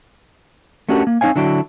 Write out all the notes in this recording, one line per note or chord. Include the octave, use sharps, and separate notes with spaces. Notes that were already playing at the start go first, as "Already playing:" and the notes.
A3 C#4 D4 F#4 G4 A#4
A#3
C4 D#4 C#5 F5 G#5
D3 F#3 D4 E4 F#4 G5